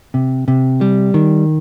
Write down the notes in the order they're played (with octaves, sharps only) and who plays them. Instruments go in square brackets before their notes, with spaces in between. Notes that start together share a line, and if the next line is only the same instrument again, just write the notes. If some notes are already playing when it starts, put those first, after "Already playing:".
[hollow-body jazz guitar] C3
C3
G3
D#3